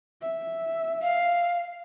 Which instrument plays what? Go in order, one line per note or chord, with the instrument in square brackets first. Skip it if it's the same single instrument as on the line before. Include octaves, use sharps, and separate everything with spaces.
[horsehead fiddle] E5
[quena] F5